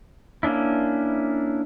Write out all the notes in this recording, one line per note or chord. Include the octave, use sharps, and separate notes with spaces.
A#3 C#4 D4 E4